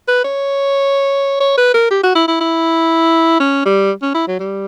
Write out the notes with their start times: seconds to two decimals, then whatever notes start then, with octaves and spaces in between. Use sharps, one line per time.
0.08 B4
0.24 C#5
1.40 C#5
1.58 B4
1.74 A#4
1.90 G4
2.03 F#4
2.15 E4
2.28 E4
2.41 E4
3.40 C#4
3.65 G3
4.02 C#4
4.14 E4
4.28 F#3
4.39 G3